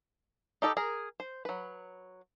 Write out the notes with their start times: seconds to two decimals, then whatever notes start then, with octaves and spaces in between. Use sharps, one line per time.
0.62 D#4 G4 A4 D#5
0.77 G#4 A#4
1.20 C5
1.45 F#3 B4